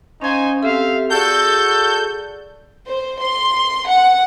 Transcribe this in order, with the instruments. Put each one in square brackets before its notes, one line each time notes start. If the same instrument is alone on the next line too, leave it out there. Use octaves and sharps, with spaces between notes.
[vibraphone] C#4 F5 [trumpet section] D#4 C5 G#5
[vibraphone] C4 G4 A4 [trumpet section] E5 F5
[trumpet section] F#4 A4 [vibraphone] G#4 D5 [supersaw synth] G6
[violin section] C5
C6
F#5